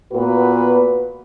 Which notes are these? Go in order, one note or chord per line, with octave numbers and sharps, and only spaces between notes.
A#2 B3 F#4 A#4 B4